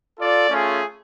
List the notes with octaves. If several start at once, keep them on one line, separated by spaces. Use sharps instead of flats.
F4 A4 D5
A3 C#4 F4 G#4